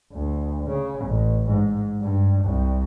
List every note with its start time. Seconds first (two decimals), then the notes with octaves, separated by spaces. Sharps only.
0.12 D2
0.67 C#3
1.05 A1
1.47 G#2
2.01 G2
2.44 C2